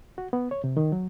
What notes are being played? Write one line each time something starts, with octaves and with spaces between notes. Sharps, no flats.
F#4
B3
C#5
C3
D#3
F#3